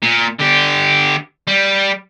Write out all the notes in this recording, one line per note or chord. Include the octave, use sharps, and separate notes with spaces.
A#2
D3 G4
G3